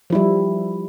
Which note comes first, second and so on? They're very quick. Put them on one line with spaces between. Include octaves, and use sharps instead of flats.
F3 E4 G3